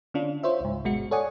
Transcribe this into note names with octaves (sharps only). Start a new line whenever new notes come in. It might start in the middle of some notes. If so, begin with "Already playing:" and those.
D3 C#4 D4 F4
F4 C5 C#5 E5
C#2 G#2
G1 B2 G#3 F#4 C#7
A4 C#5 D5 F#5 G#5 D#6